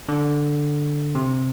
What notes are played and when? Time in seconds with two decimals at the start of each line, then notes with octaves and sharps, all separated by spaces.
0.09 D3
1.15 C3